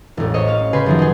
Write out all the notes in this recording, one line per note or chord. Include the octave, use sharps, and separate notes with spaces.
E1 A1
C5 C#5 D#5
C#4 F5
C#3 G4 G#4 B4 C6
F#2 D#3 F3
D#4 G#4